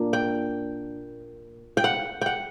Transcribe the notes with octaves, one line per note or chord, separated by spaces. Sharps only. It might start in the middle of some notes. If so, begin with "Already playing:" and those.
Already playing: A#2 A#3 D4
G5
G5
F#5
F#5 G5